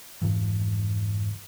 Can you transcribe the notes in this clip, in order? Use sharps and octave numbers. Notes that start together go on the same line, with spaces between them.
F2 G#2 C#3 E3